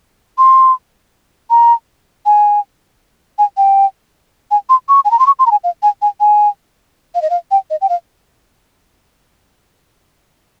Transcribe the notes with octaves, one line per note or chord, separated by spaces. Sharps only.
C6
A#5
G#5
G#5
G5
G#5
C6
C#6
G#5
A#5
C6
C#6
C6
A#5
G#5
F5
G#5
G#5
G#5
F5
D#5
F5
G5
D#5
G5
F5